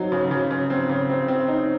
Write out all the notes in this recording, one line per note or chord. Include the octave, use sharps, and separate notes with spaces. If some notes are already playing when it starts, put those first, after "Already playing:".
Already playing: F#3 C4 D#4
C#3
C#3
C#3
C4
C#3
C4
C4
D#4